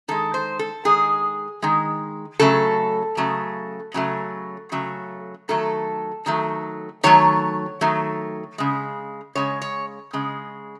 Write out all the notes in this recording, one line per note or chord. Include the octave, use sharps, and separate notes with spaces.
D#3 G#3 A4
C5
A4
D#3 G#3 G#4
D#3 G#3
C#3 F#3 A3 A4
C#3 F#3 A3
C#3 F#3 A3
C#3 F#3 A3
D#3 F#3 A3 A4
D#3 F#3 A3
D#3 F#3 A3 C#5
D#3 F#3 A3
C#3 G#3
C#3 G#3 C#5
C#5
C#3 G#3